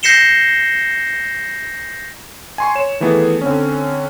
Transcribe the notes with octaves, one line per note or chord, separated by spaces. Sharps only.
G6 A#6 C7 C#7 E7 G7
G#5 C6 C#6
C#5 E7
D#3 E3 A3 B3 G#4
D3 C4 C#4